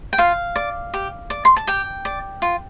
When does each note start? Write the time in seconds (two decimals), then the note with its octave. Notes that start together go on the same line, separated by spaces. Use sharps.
0.13 G5
0.18 F4 F5
0.56 D5
0.94 G4
1.30 D5
1.45 C6
1.57 A5
1.67 G4 G5
2.05 D5
2.42 F4